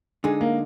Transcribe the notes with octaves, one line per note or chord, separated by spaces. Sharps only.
D3 G#3 D#4 G#4
A#3